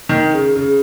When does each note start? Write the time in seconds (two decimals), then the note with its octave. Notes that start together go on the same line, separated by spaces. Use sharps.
0.09 D#3
0.33 C#3
0.56 C#3